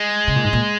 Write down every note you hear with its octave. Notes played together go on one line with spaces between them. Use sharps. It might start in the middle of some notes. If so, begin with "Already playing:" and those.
Already playing: G#3
C#3
A#2
G#2
A#2